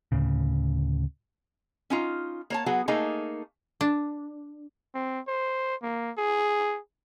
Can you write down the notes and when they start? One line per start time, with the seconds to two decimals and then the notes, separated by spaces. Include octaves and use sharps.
0.12 D2 A2 C#3
1.90 C#4 D#4 F4
2.50 A#3 C#5 A5
2.66 F#3 B3 F#4 G#4
2.88 A3 A#3 D#4 G#4 A4
3.81 D4
4.95 C4
5.28 C5
5.83 A#3
6.18 G#4